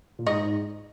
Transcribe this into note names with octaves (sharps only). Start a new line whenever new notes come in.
A#2
G#2 D#4 D#5